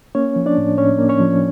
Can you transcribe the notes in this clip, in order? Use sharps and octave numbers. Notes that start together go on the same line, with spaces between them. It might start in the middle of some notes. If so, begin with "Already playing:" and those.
A#3 C#4 C#5
F3
D4 D5
A2
A2 C#4 C#5
A#3
C#4 C#5
F3